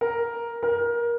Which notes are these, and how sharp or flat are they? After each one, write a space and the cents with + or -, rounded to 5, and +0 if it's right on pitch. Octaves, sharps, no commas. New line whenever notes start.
A#4 +5
A#4 +20